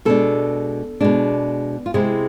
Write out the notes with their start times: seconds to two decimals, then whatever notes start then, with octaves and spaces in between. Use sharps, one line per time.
0.05 B2 G#3 D4 A4
1.01 B2 G#3 D4
1.86 F4
1.94 C3 G#3 C4 E4 G#4